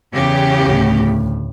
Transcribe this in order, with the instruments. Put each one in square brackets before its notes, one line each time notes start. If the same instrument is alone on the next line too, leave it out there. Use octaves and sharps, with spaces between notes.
[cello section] E2 C#3 G4
[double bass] D2 A2